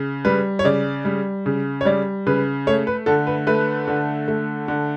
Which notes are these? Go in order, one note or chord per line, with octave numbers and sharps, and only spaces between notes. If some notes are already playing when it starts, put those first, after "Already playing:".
Already playing: C#3
G3 B4
C#5
C#3 D5
G3
C#3
C#5
G3 D5
C#3 B4
A3 C#5
B4
D3 A4
B4
A3 B4
D3
A3
D3